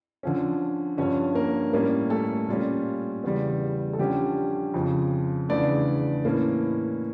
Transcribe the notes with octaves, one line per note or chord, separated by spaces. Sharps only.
D3 F3 C#4
G2 D3 F3 C#4 C#5
A#3 A#4
A2 G3 A#3 C#4 A#4
A3 A4
A#2 G3 C#4 F4
E2 C#3 G3
A4
D3 F3 G3 C#4 G4
F2 C#3 F3
E2 C#3 E3 A3 D4 D5
A2 E3 A#3 C#4